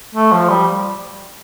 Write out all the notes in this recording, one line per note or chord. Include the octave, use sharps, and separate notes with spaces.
A3
F3
G3